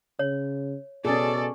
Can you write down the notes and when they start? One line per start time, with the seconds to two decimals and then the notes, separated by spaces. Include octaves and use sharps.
0.19 C#3 C#5
1.05 B2 C#4 G#4 A4 D5